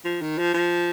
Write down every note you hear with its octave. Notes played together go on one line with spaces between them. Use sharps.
F3
D#3
F3
F3